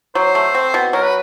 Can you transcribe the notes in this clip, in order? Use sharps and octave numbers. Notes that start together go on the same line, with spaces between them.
F#3 C5
A3
C4
B2
F#3 A#4
B4